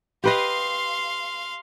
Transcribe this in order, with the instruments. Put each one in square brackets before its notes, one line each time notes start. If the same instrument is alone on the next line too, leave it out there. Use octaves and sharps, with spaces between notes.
[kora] G4 B4 D#5 [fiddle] F5 C6